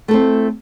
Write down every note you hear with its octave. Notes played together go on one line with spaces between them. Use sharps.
A3 C4 E4 A4